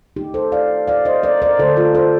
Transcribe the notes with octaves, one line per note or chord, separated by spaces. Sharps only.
D#3 A3 D#4 G4
A4 C5
D5 F5
D5 F5
C5 D#5
A#4 D5
A#4 D5
D3 A3 A4 C5
F4 A4
A4 C5